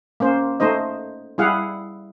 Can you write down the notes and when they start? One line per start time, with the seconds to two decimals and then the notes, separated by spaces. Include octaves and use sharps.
0.20 A#3 C#4 C5
0.60 A3 D#4 C5 D#5
1.38 G3 E4 G#4 F5 F#5